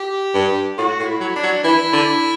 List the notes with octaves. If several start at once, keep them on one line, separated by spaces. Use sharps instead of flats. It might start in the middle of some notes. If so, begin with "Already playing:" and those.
Already playing: G4
G2
A2 F#4
A2
E4
F#3
D4
F#3
E3 E4
D3